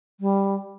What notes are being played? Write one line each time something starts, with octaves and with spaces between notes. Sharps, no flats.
G3